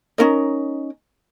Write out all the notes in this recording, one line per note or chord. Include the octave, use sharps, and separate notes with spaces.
C#4 D#4 A#4 D#5